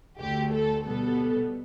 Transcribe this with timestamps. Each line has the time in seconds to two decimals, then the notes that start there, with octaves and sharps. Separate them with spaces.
0.19 D2 D3 A3 G4
0.53 A4
0.85 B2 G3 B3 A4